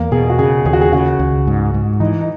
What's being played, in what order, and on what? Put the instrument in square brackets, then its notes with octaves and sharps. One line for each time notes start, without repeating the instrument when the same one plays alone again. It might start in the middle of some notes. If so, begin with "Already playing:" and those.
Already playing: [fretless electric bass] E2 [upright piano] A#3
[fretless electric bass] B2 [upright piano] G#4
[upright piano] F#4
[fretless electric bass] C#3 [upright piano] G#4
[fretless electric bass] D#2 [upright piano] G#4
[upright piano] F#4
G#4
[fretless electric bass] C#3 [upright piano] F#4
[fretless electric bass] C#2
G#2
G#2
[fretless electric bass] E3 [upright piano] D#4
[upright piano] D#4